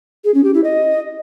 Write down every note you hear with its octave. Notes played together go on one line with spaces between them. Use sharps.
G#4
C#4
G4
E4
D#5